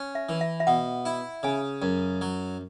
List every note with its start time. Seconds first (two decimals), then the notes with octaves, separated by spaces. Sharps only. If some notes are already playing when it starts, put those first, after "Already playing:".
Already playing: C#4
0.15 E5
0.29 E3
0.41 E5
0.60 E5
0.67 B2 F#5
1.05 E4
1.43 C#3 G#5
1.82 F#2
2.21 F#3